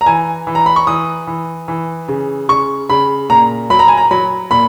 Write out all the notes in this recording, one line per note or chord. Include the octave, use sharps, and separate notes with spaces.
A#5
E3 G#5
E3
A#5
B5
C#6
E3 D#6
E3
E3
C#3
C#3 C#6
C#3 B5
A#2 A#5
F#3 B5
A#5
G#5
A#5
F#3 B5
A#2 B5